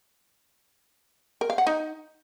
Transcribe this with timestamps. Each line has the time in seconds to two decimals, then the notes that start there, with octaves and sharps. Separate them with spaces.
1.41 A#4
1.50 F5
1.58 F#5
1.67 D#4